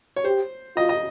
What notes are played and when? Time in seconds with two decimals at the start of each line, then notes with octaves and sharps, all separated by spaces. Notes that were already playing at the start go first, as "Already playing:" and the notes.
0.16 C#5
0.25 G4 C5
0.76 F4 D#5
0.89 D#5